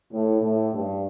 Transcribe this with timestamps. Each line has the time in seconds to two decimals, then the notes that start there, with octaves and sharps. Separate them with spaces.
0.11 A2
0.41 A2
0.73 G2